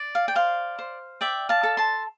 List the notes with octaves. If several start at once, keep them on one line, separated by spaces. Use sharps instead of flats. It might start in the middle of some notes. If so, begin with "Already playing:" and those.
Already playing: D5
F5
G5
C5 F5
C5
D5 E5 G5
F5 A5
A4
A5 C6